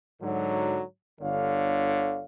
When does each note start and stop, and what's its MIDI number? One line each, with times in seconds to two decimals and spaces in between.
0.22 0.81 44
0.22 0.81 50
0.22 0.81 54
1.20 2.25 31
1.20 2.25 50
1.20 2.25 73
1.20 2.25 77